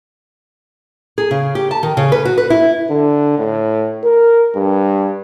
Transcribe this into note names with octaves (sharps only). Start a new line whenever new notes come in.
G#4
C#3
G4
A5
D#3
C#3
B4
F#4
B4
E4
D3
A2
A#4
G2